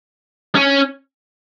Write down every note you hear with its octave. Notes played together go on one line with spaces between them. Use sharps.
C#4